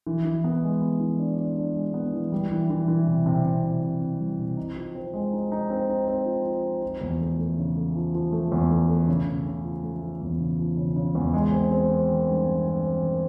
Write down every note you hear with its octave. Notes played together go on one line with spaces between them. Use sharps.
E3
E3
B3
G#3
B3
E3
D4
D4
D4
G#3
B3
E3
G3
E3
E3
E3
C3
C3
C3
C3
C3
C3
G3
C3
D#4
F3
C4
G#3
D#4
D#4
C4
D#4
C4
F3
F3
D#4
F3
E2
A3
A3
C#3
A3
F3
F3
A3
E2
A3
A3
C#3
C#3
C#3
F3
A3
F3
E2
C#3
F3
C#3
C#3
E2
G#3
C4
C4
C4
D#3
G2
C4
C4
C4
D#3